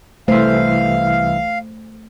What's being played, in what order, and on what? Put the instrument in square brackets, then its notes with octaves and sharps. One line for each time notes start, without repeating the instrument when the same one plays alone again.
[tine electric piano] C2 E3 E5 [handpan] A3 C5 [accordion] F5